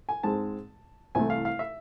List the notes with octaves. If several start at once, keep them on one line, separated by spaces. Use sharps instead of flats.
G#5
G#2 G#3 C4 A5
C2 C3 E3 A3 G#5
F5
F5
E5